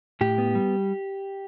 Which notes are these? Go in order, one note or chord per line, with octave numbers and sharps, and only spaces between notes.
A2 G4
B3
G3